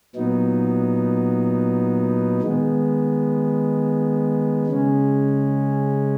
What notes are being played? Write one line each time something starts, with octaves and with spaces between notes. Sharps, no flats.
A#2 F#3 B3 D#4
D#3 G#3 B3
C#3 G#3 C#4